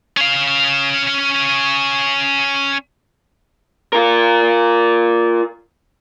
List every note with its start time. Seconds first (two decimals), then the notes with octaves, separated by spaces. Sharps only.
0.17 C#4 F5
3.93 F4 A#4